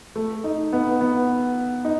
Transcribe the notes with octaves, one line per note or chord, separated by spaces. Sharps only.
A3
D#4
B3
B3
D#4